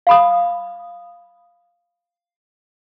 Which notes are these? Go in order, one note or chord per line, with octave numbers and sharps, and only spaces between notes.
F5 B5 D#6